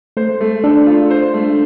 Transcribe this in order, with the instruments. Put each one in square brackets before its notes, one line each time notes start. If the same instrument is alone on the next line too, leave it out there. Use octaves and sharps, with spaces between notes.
[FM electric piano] A3 [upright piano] C5
[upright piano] A3
[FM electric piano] D4 [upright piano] A4
[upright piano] F4
C5
A3